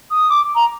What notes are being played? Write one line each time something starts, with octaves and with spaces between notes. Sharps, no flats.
D#6
D6
A#5